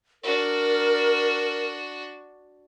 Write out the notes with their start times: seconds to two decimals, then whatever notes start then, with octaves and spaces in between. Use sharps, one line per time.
0.24 D4 F#4 A#4